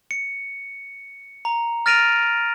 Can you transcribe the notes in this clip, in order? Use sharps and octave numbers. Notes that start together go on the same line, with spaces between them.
C#7
A#5
F6 A6 A#6 D7 D#7 F7